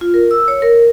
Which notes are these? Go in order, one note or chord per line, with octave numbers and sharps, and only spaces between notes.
F4
A#4
E6
C#5
A#4